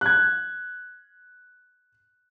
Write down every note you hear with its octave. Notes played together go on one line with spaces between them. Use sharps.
F#6 G#6